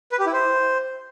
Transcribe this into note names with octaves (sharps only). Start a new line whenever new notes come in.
B4
G4
E4
C5